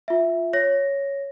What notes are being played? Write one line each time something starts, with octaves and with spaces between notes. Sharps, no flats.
F4 E5
C#5 A#6